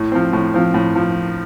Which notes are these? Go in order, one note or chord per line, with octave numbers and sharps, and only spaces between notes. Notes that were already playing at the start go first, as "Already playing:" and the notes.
Already playing: A2
F3 C4
A2
F3 C4
A2
F3